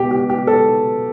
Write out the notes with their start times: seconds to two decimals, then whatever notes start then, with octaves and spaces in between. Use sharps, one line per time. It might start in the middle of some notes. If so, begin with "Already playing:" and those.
Already playing: B2 G4
0.11 G4
0.30 G4
0.47 A4